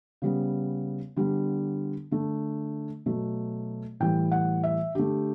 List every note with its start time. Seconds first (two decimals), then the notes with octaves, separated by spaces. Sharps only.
0.22 C#3 G3 B3
1.17 D3 G3 B3
2.11 D3 A3
3.06 B2 F#3 A3
4.00 A2 E3 G3 G5
4.31 F#5
4.64 E5
4.95 D3 A3 G4